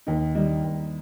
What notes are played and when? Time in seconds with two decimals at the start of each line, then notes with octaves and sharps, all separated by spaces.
0.07 D#2 D#4
0.35 D#3 G3 D#4
0.64 D#2